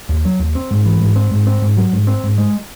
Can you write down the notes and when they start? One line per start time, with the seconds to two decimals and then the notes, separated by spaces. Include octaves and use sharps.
0.09 D#2
0.25 F#3
0.39 D#2
0.55 C4
0.71 G#2
0.86 E3
1.00 G#2
1.16 C4
1.31 G#2
1.47 C4
1.62 G#2
1.77 F#3
1.93 G#2
2.07 C4
2.23 G#2
2.38 G#3